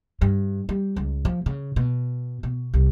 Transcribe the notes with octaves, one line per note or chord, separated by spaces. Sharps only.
G2
G3
C#2
F3
C#3
B2
B2
C2